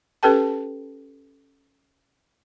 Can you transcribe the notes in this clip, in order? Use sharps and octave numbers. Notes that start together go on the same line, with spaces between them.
C#4 G4 A4 B4 G5 A5